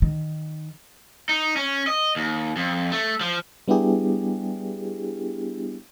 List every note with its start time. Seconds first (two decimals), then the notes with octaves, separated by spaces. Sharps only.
0.02 D#3
1.29 D#4
1.56 C#4
1.87 D#5
2.16 D#2
2.56 F2
2.92 A3
3.21 F3
3.68 G3 B3 D4 E4 G4 G#4